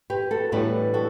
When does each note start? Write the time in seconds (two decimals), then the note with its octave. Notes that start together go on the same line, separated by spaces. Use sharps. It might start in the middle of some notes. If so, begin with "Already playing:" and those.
0.10 G4 B4
0.31 F#4 A4
0.52 A2 E3 G3 B3 D4 G4 B4
0.94 F#4 A4